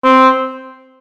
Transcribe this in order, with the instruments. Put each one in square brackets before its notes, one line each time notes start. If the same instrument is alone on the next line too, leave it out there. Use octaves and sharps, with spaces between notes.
[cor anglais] C4